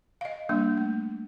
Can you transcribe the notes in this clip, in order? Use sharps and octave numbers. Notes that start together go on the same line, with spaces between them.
D#5 F5
G3 A#3 D4
A3